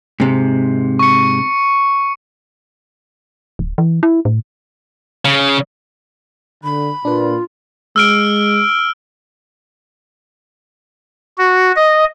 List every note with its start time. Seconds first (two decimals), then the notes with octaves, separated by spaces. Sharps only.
0.20 G#2 C3
0.99 C#6 C#7
3.59 D1
3.78 E3
4.03 E4
4.25 A2
5.25 C#3
6.64 D3 B5
7.05 A#2 D4 F4 B4
7.96 G#3 E6 F6 D7
11.38 F#4
11.76 D#5